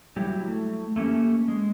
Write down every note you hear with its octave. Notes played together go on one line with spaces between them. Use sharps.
F#3 G3 E4 G4
A3
A3 A#3 C#4 G4
G#3